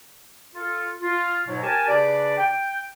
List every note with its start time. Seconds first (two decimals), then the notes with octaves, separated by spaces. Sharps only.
0.55 F4 A4
1.01 F4
1.47 G#2 B2 F#3
1.63 G4 A#4 G#5 A5
1.87 C#3 D4 G4 B4 D5
2.38 G5